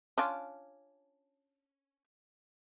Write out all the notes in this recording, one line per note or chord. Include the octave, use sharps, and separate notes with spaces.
C#4 D4 F4